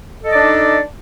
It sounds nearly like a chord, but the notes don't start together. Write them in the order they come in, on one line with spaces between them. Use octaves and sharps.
A4 D#5 D5 D4 D#4